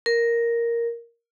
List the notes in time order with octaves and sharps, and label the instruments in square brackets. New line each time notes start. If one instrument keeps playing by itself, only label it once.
[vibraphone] A#4